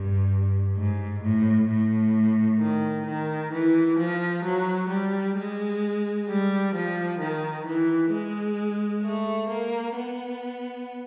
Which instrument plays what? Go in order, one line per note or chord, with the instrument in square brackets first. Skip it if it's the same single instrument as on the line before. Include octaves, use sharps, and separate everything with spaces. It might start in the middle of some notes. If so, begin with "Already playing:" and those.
Already playing: [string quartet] G2
G#2
A2
A2
D#3
D#3
E3
F3
F#3
G3
G#3
G3
F3
D#3
E3
G#3
A3
A#3
B3